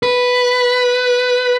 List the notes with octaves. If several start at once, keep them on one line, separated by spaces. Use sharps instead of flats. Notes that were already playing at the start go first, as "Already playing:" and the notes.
B4